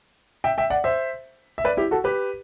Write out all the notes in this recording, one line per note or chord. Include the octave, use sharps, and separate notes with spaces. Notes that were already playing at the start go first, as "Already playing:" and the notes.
E5 G5
E5 G5
D5 F#5
C5 E5
E5
B4 D5
E4 G4
F#4 A4
G4 B4